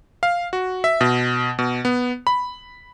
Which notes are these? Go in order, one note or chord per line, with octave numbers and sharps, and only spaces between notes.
F5
F#4
E5
B2
B2
B3
B5